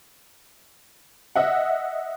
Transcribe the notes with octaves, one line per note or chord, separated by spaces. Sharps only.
D#5 E5 F#5